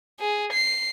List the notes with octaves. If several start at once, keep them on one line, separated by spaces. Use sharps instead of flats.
G#4
C7